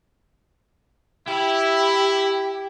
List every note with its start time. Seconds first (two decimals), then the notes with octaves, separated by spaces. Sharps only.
1.28 E4 G4